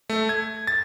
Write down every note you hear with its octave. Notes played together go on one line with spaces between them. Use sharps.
A3
G#6
A6